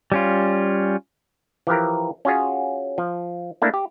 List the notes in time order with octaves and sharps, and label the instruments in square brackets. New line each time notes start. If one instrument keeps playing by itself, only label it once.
[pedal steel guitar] G3 C#4 F4
[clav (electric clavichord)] E3 F3 G4 A#4
C#4 F4 F#4 G#4 C#5
F3
A3 A#3 D4 E4 A4
G4